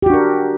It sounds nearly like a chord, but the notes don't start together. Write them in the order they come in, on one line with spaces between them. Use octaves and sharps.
G4 F#4 D4 A#4